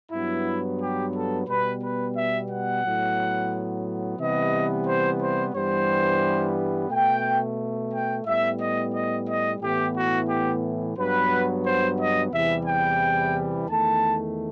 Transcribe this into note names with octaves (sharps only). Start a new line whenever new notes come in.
G2 F#3 B3 E4
G4
A4
B2 G3 B3 B4
B4
E5
F#5
A2 F#3 B3
C3 E3 G3 B3 D#5
C5
C5
G2 E3 G3 B3 C5
B2 A3 G5
G5
A2 G3 B3 E5
D#5
D#5
D#5
A2 E3 B3 G4
F#4
G4
G2 F#3 B3 B4
C5
D#5
E2 C3 E3 G3 E5
G5
E2 D#3 A3 A5